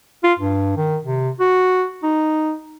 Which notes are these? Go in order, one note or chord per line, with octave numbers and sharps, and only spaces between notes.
F4
G2
D#3
C3
F#4
D#4